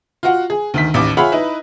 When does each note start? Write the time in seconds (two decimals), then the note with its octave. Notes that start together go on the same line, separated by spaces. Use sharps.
0.23 F4 F#4 F#5
0.50 G#4
0.74 D2 D#3 B6
0.94 A1 D#2 D6
1.17 F4 G#4 C#5 E5 F#5 B5
1.32 D#4 E4 B4